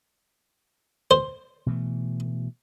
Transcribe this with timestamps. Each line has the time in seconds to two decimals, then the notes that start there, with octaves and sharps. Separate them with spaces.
1.11 C5
1.66 B2 E3 A3